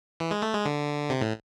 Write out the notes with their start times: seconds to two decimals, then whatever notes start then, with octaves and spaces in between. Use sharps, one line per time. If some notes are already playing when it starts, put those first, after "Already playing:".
0.20 E3
0.31 G#3
0.42 A3
0.54 G#3
0.66 D3
1.10 C3
1.21 A2